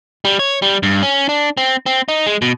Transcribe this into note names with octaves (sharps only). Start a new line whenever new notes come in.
G3
C#5
G3
G2
C#4
D4
C4
C4
D#4
G#3
B2